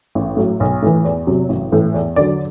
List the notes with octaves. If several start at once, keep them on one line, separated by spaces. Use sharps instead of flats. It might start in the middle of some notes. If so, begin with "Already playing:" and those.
A1
A2 F#3
B1
A2 E3
E2
C3 F#3
A1
A2 E3
E2
D3 F#3 D5